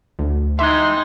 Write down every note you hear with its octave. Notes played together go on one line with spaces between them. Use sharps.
D2
E3 G#3 D#4 E5 G5 C6